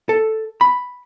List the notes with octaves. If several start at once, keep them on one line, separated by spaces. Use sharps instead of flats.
A4
B5